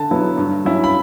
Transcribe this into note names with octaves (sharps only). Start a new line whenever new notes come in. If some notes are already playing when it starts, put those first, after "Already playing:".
Already playing: D3 A5
F#3 B3 E4
G2
F#3 C#4 E4
B5